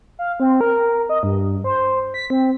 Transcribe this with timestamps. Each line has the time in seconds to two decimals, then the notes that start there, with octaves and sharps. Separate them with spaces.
0.19 F5
0.40 C4
0.61 A#4
1.09 D#5
1.23 G2
1.64 C5
2.14 B6
2.30 C4